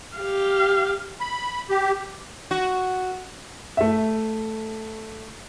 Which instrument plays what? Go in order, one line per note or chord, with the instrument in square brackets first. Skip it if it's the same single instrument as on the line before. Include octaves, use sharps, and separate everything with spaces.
[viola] G4 F5
[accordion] B5
G4
[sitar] F#4
[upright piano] A3 E5